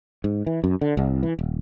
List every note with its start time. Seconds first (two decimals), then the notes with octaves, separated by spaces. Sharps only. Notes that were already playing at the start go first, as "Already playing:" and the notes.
0.24 G#2
0.46 E3
0.64 F#2
0.81 D3
0.97 C2
1.23 E3
1.39 D#1